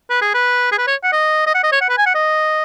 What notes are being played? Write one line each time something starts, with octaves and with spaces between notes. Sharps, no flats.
B4
G#4
B4
G#4
B4
C#5
F#5
D#5
D#5
F#5
D#5
C#5
F#5
B4
G#5
F#5
D#5